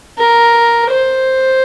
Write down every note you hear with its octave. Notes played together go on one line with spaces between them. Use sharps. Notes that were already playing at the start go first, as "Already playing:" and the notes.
A#4
C5